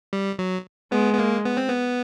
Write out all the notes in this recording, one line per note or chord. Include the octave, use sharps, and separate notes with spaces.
G3
F#3
G#3 B3
B3
A#3
B3
C4
B3